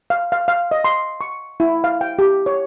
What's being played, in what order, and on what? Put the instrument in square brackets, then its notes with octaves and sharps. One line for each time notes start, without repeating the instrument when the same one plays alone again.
[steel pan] F5
F5
F5
D#5
C6
C#6
E4
F5
G5
G4
C#5